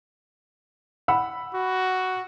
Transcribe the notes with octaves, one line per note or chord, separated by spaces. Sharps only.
F#5 B5 E6
F#4